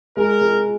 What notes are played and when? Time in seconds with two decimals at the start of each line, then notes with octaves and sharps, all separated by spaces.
0.16 G#3 A#4
0.41 G#3